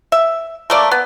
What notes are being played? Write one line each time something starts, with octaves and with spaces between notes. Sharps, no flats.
E5
A3 A#3 D5
B3